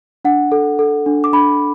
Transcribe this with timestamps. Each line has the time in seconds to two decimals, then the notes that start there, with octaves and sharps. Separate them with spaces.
0.25 D4 F#5
0.52 A4
0.79 A4
1.06 D4
1.24 D6
1.33 D4 B5